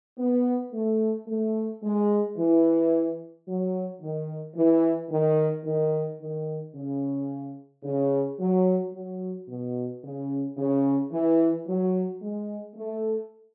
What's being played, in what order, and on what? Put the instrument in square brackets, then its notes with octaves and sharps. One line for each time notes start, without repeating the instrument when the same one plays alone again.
[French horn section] B3
A3
A3
G#3
E3
F#3
D#3
E3
D#3
D#3
D#3
C#3
C#3
F#3
F#3
B2
C#3
C#3
E3
F#3
G#3
A3